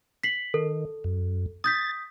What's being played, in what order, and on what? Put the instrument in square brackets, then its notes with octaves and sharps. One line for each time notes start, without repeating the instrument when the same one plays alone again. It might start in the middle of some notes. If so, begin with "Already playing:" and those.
[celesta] B6 C7 F#7
[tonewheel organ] D#3 [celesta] A4
[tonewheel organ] F#2
[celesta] D#6 G6 B6 [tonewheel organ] A6